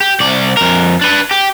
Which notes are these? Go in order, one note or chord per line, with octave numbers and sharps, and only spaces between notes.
G4
C2 D5
F2 A#4
D4 B4
G4